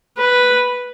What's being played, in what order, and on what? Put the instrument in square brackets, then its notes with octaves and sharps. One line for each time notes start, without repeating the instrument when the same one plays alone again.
[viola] B4